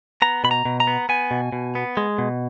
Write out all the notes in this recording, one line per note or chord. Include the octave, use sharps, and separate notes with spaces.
B3 A#5
B2 B5
A#5
B2
A#5
B3
B3 G#5
B2
B2
B3
G#3
B2